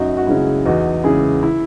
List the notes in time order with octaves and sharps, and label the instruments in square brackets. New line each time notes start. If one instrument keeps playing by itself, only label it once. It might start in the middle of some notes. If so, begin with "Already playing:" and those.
Already playing: [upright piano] F#2 D#4 F#4
F#4
C#3 G#3 C#4 E4
E2 D#4 F#4
C#3 G#3 C#4 E4 G#4
E4